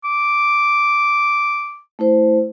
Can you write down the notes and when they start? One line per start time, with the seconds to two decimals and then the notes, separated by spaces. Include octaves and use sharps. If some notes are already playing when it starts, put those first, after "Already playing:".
0.04 D6
1.99 A3 E4 C5